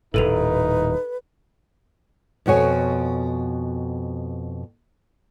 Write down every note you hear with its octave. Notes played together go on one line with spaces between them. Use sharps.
D#1 G#1 A2 D#4 A4 B4 D#7 F7
F2 B2 F#4 C#5 G#5